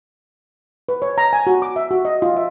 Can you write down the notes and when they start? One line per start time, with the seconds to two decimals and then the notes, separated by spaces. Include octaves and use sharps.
0.89 B4
1.02 C#5
1.18 A#5
1.33 G#5
1.47 F#4
1.62 D6
1.76 E5
1.91 F#4
2.05 D#5
2.22 F4
2.36 E5